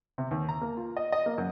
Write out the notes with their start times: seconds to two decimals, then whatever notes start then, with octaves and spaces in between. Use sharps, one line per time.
0.18 C3
0.31 D#2
0.49 A#5
0.61 A#3
0.77 F4
0.97 D#5
1.12 D#5
1.26 A#3
1.38 F#2